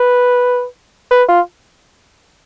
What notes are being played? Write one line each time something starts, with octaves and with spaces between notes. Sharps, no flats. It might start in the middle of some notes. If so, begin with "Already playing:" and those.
Already playing: B4
B4
F4